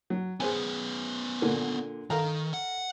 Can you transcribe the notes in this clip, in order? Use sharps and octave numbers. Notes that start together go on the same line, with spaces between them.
F#3
B3 C#4 G#4 C5 G#5
A#2 D3 A#3
D#3 A4 F5 A#5
F#5